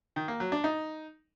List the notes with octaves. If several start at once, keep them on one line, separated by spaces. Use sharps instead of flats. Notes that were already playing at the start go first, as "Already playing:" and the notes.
D#3
A#3
F#3
D4
D#4